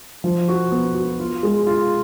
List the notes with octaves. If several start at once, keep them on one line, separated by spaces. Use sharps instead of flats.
F3
F#4
B3
F#4
F4
G#3
F4